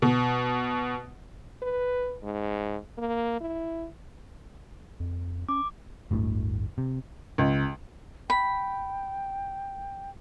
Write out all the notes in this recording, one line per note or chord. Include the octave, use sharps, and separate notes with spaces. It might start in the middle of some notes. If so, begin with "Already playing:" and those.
B2
B4
G#2
A#3
E4
F2
C#4 D6
G1 D2 A2
C3
C#2
G5 B5